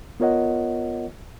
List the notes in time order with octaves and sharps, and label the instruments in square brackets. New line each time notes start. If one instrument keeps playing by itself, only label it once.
[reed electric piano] B3 F4 A#4 C#5 D#5 F#5